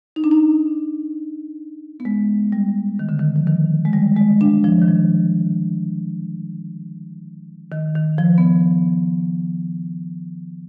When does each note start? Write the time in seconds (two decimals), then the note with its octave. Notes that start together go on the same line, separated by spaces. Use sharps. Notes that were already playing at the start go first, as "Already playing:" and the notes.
0.16 D#4
0.24 D4
0.31 D#4
2.00 B3
2.05 G#3
2.52 G3
2.99 D#3
3.09 D3
3.19 D#3
3.36 F3
3.47 D#3
3.85 G#3
3.93 G3
4.17 G#3
4.41 D4
4.64 F3
4.82 D#3
4.88 F3
7.72 D#3
7.95 D#3
8.18 F3
8.38 B3